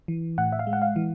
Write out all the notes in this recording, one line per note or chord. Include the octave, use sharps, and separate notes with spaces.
E3
A2 F#5
E5
F5
G#3
F#5
F5
E3